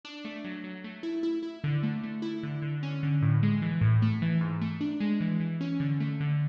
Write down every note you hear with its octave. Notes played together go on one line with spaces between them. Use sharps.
D4
A3
F#3
F#3
A3
E4
E4
E4
D3
A3
A3
E4
D3
D3
C#4
D3
A2
G#3
E3
A2
A3
E3
G#2
A3
D4
G#3
E3
E3
C#4
D3
A3
D3